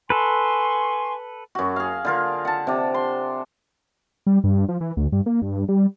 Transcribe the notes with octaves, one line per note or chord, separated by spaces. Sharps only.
A4 B4 G#5 C6 C#6
F#2 F#4
G#4 F5
D3 F4 A#4
F#5 A5
C3 D4
C6
G3
G2
F3
E3
D2
G2
A#3
G2
G3